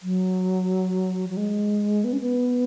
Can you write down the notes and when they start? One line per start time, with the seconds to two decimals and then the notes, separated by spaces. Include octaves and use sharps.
0.03 F#3
1.29 F#3
1.37 G#3
2.04 B3
2.13 C#4
2.21 B3